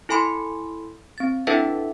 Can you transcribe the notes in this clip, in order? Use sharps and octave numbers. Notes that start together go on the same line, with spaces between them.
E4 A4 G#5 B5 C6
C4 A6
D4 E4 A4 B4 E5 F#5